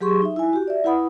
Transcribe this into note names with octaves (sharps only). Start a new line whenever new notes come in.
F#3 G4 G#4 C6 C#6
D#4 E5
E4 G#5
F#4 G4
D5 E5
E4 B4 F#5 B5 D#6